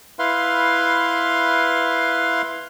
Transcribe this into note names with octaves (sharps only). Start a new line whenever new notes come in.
E4 B4 F5 C6